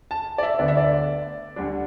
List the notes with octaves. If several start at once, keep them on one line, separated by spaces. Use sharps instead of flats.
A5
D5
E5
D2 D3 B3 D5
E5
D5
D2 D3 G3 D4